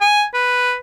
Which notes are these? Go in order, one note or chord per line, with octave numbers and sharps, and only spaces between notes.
G#5
B4